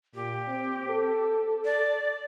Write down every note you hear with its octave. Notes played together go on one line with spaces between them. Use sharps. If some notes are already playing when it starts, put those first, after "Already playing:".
A#2 G4
C4
A4
D5